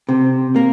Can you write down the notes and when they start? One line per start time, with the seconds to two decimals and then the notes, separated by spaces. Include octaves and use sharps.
0.09 C3
0.56 A#3